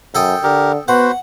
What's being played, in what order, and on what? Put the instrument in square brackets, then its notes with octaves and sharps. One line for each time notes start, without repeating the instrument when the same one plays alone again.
[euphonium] F#2 [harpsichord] A4 G5 D#6
[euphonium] D3 [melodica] G4 A#4
[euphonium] B3 [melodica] F#4 B4 C5 [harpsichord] F#5